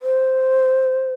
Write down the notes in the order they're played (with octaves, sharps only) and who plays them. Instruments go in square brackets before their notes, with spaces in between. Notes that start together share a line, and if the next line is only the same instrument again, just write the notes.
[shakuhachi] C5